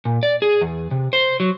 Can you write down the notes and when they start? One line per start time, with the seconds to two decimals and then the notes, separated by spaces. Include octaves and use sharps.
0.05 A#2
0.23 D5
0.42 G#4
0.61 E2
0.91 C3
1.13 C5
1.40 F#3